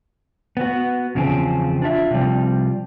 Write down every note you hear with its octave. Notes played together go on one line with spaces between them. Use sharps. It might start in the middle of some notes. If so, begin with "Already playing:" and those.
B3 F#4
E2 C#3 F3 C4 C#4 G#4
D4 F4 E5
C3 F3 G3 C4